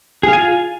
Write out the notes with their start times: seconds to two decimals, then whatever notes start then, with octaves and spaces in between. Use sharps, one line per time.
0.23 G#4
0.28 F5
0.33 G#5
0.38 F4